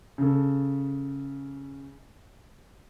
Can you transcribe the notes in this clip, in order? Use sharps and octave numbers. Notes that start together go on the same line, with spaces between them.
C#3 A4